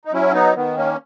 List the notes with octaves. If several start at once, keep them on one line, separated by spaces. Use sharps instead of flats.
D#4
F#3 C#4 E4
B3 D#4
D#3 B3
A#3 C#4